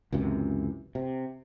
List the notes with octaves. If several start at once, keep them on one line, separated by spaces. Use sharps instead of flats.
C#2 F#2 C3 E3
C3